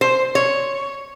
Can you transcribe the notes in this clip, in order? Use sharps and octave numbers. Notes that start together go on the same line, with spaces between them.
C5
C#5